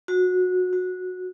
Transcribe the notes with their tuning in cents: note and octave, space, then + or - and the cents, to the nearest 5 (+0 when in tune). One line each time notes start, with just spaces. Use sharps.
F#4 -20
F#4 -15